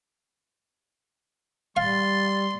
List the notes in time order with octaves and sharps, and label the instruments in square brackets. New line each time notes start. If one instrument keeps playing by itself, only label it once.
[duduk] G3 [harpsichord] F5 [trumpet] C6 [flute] A6